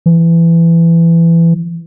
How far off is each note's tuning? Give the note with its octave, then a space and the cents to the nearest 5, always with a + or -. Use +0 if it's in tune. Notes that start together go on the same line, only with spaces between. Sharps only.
E3 +20